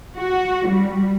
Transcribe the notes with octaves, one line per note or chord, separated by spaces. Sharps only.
F#4
G3